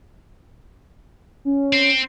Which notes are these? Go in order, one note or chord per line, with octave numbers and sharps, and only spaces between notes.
C#4
C4